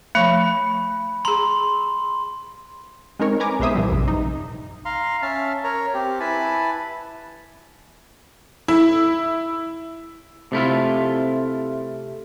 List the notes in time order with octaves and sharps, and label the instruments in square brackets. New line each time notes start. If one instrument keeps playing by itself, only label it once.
[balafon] F3 A3 [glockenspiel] B5
[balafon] G#4 A#5 [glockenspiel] C6
[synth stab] G#3 C4 D#4 A#4 C#5
B4 G#5 A#5 D6
B1 G#3 B3 C5 E5 D#6
A#2 E3 F3 G3
A#1 F#2 C3
D#4
[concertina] F5 A#5 C6
C#4 E5 A5 F6
A#4 C#5 A#5
C4 G4
E4 B4 G#5 A5 B5
[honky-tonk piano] E4
[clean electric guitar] C3 A3 E4 F4